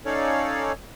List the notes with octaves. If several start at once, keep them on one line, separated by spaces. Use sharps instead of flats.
C#4 D#4 A4 C#5 D5 F5